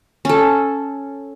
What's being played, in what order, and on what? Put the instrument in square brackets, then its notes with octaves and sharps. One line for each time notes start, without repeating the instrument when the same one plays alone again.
[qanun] C#4 A4